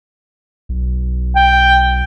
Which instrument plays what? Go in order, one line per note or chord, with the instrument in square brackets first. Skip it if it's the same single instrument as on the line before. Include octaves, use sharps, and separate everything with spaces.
[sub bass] B1
[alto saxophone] G5